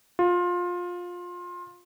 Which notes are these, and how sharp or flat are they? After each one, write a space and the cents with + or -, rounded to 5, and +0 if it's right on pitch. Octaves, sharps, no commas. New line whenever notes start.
F4 +20